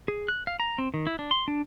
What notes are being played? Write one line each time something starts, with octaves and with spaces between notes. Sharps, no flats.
G#4
F#6
F5
A#5
C4
D#3
E4
D4
C6
D4